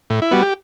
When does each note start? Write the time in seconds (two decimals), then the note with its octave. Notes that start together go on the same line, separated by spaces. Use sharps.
0.10 A2
0.22 E4
0.31 G3 B3 F#4
0.43 G4